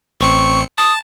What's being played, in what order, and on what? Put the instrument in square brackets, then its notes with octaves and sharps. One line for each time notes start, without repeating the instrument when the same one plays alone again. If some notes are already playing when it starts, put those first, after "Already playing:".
[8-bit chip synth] A1 C4 C#7 [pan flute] C#6
[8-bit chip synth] A5 [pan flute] D#6